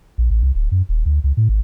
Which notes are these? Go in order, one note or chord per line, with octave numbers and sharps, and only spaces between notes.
A#1
A1
C2
D1
F#2
D#1
D2
C#2
A2
G#1